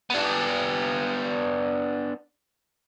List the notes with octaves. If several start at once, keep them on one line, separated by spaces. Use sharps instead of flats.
B3 D4